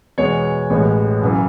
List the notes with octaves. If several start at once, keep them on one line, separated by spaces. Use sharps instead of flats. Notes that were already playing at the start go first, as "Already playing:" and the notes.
E2 B2 G#3 B3 C#5
A1 A2 G#3 B3
F#2 C#3 E3